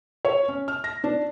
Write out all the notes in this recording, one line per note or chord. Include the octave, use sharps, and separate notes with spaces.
C#5
C#4
F6
A#6
D4